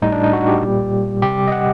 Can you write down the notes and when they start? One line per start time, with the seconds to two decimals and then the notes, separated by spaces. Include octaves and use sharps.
0.02 A2 G3 D#4
0.12 D4
0.23 D#4
0.33 F#4
0.48 G4
0.63 A#2 G3
1.22 C3 G3 G4
1.48 D#5
1.52 F#5